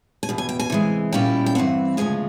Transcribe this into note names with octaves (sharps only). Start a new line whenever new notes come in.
G#5
E2 B2
G#5
G5
G#5
C3 E3 G#3
A#2 G3 A#3 C#4 E4 G5
G5
G2 E3 A3 C4 F#5
D2 C#3 F3 G#3 G#5